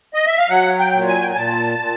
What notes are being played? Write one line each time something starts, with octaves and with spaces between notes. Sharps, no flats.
D#5
E5
F5
F#3 F#5
G5
A#2
G#5
G5
G#5
A#2 A5
A#2